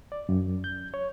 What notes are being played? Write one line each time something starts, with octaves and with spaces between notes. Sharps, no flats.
D5
F#2
G6
C#5